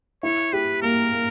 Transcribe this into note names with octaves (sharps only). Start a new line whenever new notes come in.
E4 C#5
G4 B4
A#3 A#4
A#3